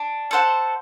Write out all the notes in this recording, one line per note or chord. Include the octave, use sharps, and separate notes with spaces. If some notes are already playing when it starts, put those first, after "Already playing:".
Already playing: D4
A4 C5 F#5